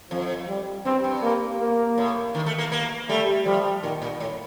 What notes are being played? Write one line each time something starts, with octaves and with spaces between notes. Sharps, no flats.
F2 F3
G3
G2 C4
G2
A#3
A#3
A2
D#3
A3
A#3
A#3
G3 A3
F3 G3
A#2 D#3
A#2
A2